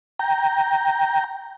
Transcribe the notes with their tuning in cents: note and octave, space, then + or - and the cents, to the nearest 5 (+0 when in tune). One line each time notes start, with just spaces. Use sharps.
G5 +0 A#5 +0